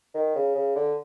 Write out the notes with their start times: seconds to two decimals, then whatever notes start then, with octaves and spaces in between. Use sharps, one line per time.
0.14 D#3
0.35 C#3
0.55 C#3
0.75 D3